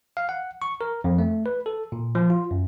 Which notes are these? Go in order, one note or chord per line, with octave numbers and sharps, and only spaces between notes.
F5
F#5
C#6
A#4
F2
A3
B4
A4
A#2
F3
F4
F#2